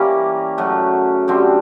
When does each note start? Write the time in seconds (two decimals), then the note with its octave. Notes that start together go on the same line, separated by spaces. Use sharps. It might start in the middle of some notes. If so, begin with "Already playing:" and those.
Already playing: E3 G3 A#3 C#4
0.58 F#2 C#3 F#3 A3
1.28 F#2 D3 G3 C4